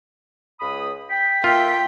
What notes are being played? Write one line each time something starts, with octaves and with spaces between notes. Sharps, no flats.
C#2 B5 D#6
G5 B6
A#3 F4 E5 G5